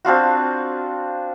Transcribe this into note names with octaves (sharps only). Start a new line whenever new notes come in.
C4 D4 F4 F#4